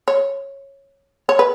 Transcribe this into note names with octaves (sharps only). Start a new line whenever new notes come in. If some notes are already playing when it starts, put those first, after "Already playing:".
C#5
C#5
B4